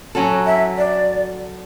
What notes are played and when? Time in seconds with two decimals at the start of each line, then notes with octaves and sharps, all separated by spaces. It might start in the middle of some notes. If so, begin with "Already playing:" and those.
0.15 F#3 C#4 F#4 A4
0.46 E5
0.77 D5